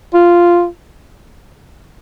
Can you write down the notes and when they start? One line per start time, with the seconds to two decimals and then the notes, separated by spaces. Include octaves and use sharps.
0.14 F4